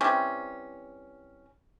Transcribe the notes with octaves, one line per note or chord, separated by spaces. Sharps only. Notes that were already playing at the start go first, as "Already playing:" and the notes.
E3 G3 C4 C#4